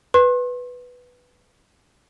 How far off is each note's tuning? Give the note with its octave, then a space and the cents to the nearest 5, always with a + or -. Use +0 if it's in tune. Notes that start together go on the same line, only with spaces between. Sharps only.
B4 +0 C6 +40